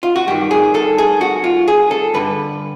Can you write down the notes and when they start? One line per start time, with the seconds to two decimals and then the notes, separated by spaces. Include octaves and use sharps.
0.03 F4
0.16 F#4
0.27 G2 D#3 G4
0.51 G#4
0.75 A4
0.98 G#4
1.21 F#4
1.44 F4
1.68 G#4
1.91 A4
2.14 G2 D3 B4